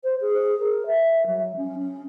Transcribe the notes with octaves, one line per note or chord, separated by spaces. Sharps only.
C5
G#4
A#4
E5
F#3
C#4
C#4